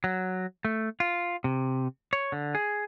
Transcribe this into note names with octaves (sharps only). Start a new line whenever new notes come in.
F#3
A3
F4
C3
C#5
D3
G#4